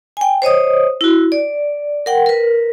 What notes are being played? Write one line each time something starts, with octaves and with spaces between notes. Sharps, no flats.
G5 G#5
C5 C#5 D#5 D#6
E4 F#4
D5
A#4 F#5 G5
A#4 B4